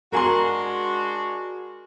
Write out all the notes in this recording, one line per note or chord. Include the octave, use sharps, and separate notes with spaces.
G#3 D4 F#4 A#4 G#5 C6